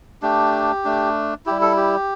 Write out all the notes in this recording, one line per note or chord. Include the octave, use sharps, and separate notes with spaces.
A3 D4 G4
A3 D4
G3 E4 G4
A4
G4